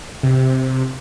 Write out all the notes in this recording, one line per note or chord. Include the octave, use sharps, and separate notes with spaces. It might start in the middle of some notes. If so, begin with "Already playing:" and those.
C3